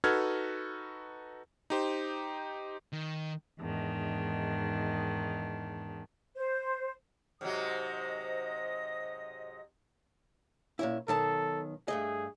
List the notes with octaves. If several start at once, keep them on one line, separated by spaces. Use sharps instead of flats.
D#4 F#4 A4 B4 F6 G#6
D#4 G4 C5
D#3
E2 G#2 D#3 D4
C5
G#2 C3 F#3 D#5 D#6
A#2 C#4 E4
B1 D#3 A4 A5
G2 A3 G#4 D#5